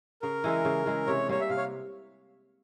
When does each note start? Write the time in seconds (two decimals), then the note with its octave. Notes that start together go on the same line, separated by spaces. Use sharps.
0.22 C#3 A#4
0.44 E3 G#3 E4
0.65 C#3
0.86 E3 G#3 E4
1.07 C3 C#5
1.28 G3 A#3 C#4 C#5
1.41 E5
1.50 C3 F5
1.58 C#5